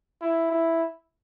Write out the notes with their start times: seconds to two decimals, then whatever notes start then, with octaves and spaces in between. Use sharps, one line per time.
0.21 E4
0.51 E4